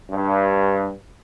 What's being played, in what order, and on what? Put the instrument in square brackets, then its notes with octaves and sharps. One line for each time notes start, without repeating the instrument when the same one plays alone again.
[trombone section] G2